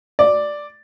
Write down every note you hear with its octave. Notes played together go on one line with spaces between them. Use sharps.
D5